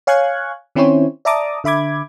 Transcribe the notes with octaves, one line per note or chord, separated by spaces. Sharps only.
C#5 F5 G#5 C#6 F#6 G#6
D#3 C4 C#4 E4 C5 C#5
D5 E5 A5 A#5 D6 D#6
D3 E5 B5 D6 G#6